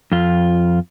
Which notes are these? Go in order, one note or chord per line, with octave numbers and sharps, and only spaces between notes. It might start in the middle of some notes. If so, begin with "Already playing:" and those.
F2 F4